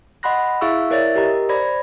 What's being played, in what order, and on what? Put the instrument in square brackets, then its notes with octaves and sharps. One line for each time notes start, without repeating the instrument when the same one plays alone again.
[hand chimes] D#5 F#5 B5 C6 F#6 A#6
E4 G#4 E5 F5 C#6 E6
E4 A#4 C#5 D5 E5 A6
G4 A#4 D#5 A#5
C5 D5 B5 G#6 A#6